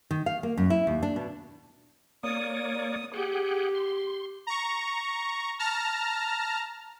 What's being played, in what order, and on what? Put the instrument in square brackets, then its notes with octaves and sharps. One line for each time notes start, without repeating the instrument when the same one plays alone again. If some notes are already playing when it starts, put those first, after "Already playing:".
[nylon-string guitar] D#3
F5
A#3
F#2
E4
D#2
D4
B2
[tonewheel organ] A#3 C#5 D5 [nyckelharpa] D#6
[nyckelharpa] G4 [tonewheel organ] G#4 F#5 G5
[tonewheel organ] C6
[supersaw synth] A#5 C#6
A5 A#5 F6